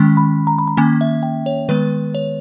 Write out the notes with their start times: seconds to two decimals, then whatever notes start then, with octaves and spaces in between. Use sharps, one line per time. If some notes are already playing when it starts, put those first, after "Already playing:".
Already playing: D#3 G#3 C#4
0.17 B5
0.47 A#5
0.59 B5
0.68 A#5
0.77 D#3 A#3 C#4 G#5
1.01 E5
1.23 G5
1.46 C#5
1.69 D#3 G#3 B3 B4
2.15 C#5